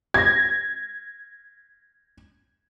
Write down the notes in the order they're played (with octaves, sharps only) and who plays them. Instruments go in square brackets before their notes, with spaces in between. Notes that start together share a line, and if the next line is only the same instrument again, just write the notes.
[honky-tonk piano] G#6 A#6